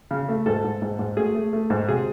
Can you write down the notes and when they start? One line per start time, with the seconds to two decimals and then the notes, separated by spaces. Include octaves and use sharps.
0.11 C#3
0.29 A3
0.46 G#2 A4
0.64 G#2
0.82 G#2
0.99 G#2
1.17 A3 G#4
1.35 A3
1.53 A3
1.70 G#2
1.88 C3 G#4